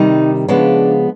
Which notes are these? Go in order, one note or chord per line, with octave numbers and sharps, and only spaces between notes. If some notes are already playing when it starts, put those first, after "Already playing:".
Already playing: C3 D#3 G3 D#4
C#3 F3 G#3 B3 D4